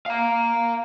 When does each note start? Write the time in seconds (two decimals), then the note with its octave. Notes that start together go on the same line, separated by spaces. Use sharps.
0.06 F5 A#5